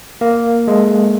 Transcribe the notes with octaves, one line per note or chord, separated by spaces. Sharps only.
A#3
G#3